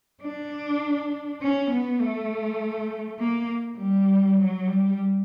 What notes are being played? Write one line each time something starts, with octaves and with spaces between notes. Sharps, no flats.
D4
C#4
B3
A3
A#3
G3
F#3
G3